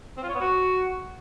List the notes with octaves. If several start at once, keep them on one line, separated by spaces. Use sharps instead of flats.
C4
F4
C#5
B3
F#4